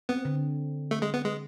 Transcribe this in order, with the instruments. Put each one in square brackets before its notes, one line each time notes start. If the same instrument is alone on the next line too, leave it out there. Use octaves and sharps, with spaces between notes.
[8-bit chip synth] B3 [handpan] C4
[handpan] D3
[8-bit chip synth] A3
G#3
B3
G#3